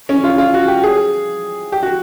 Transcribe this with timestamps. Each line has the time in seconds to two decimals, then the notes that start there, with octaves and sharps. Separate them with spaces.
0.09 C#4
0.24 F4
0.38 F4
0.54 F#4
0.68 G4
0.83 G#4
1.72 G4
1.83 F#4